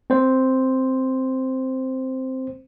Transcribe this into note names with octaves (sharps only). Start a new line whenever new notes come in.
C4 C5